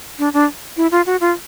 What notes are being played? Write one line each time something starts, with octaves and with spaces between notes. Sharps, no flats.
D4
D4
E4
F4
F#4
F4